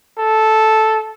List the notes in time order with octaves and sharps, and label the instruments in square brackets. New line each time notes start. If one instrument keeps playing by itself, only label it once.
[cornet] A4